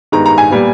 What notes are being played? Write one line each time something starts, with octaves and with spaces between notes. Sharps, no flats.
G2 D#3 G#3 B3 A#5
A#5
G#5
A#2 G3 B3